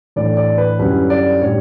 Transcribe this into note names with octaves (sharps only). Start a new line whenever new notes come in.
A2 E3 A3 D4 D5
D5
B4
F#2 D3 G3 C#4 E4 B4
D5
A2 G3 D4 C#5